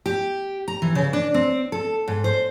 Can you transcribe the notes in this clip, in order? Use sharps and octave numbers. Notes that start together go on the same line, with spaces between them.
G4
A#5
E3
C#3
D4
C4
A4
G#2
C5